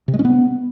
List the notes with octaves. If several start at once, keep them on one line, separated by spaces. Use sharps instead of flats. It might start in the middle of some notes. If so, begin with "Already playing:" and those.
C3
G#3
C#4
B3